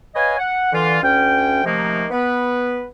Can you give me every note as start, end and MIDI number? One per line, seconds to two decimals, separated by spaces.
0.15 0.38 71
0.15 0.38 73
0.15 0.38 75
0.15 0.38 77
0.15 0.38 80
0.39 0.70 78
0.73 0.99 50
0.73 0.99 52
0.73 0.99 65
1.02 1.63 38
1.02 1.63 61
1.02 1.63 79
1.65 2.05 48
1.65 2.05 51
1.65 2.05 53
1.65 2.05 57
1.65 2.05 58
1.65 2.05 63
2.11 2.84 59
2.11 2.84 71